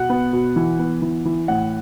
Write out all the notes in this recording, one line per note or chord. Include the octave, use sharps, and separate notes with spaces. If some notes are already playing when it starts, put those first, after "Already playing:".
Already playing: B2 F#5
B3
B2
E3
B3
E3
E3
A2 F#5